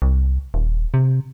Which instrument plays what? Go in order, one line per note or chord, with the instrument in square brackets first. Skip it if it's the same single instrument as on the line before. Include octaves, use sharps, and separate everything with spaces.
[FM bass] C2
D#1
C3